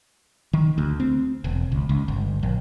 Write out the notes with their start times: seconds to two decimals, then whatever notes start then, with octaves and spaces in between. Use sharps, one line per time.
0.53 D#3
0.78 D2
1.00 C4
1.44 E1
1.72 C#2
1.89 C#2
2.08 G1
2.43 A#1